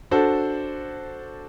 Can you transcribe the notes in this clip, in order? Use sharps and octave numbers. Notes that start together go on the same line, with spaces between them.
D4 F#4 A4 C5